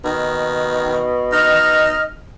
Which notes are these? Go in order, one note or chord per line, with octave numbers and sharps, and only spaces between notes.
B2 D#3
D#4 D#5 F6